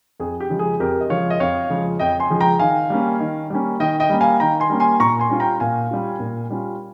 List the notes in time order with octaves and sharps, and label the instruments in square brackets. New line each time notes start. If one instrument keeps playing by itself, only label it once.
[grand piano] F2 G#4
G4
C#3 F3 G#3
G#4
F2 G4 A#4
D#5
C#3 F3 G#3 C#5 F5
D#5
F2 C#5 F5
C#3 F3 G#3
F2 D#5 G5
G#5 C6
C#3 F3 G#3
G5 A#5
D#3 F5 G#5
G3 A#3 C#4
D#3
G3 A#3 C#4
D#3 D#5 G5
D#5 G5
G3 A#3 C#4
F5 G#5
D#3 G5 A#5
G#5 C6
G3 A#3 C#4
G#5 C6
A#2 A#5 C#6
G#5 C6
G3 C#4 F4
G5 A#5
A#2 F5 G#5
G3 C#4 F4
A#2
G3 C#4 F4